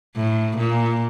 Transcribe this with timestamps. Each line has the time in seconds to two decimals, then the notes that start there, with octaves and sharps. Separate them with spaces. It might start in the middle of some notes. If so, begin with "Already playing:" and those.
0.17 A2
0.58 A#2